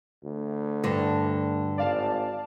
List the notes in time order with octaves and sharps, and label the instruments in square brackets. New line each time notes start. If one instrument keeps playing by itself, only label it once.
[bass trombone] D2
[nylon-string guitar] G2 D3
[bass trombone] G#1 [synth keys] D5 F5 A5